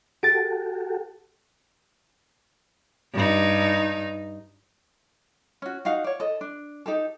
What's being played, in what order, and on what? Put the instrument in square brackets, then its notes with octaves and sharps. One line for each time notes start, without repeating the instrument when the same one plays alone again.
[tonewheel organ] F#4 G4 A4 [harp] A6 D7
[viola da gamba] G2 D#4
[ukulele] C#4 F#4
D#4 F#4 F5 F#5
C#5 D5
A4 D#5
D4
D#4 G4 A4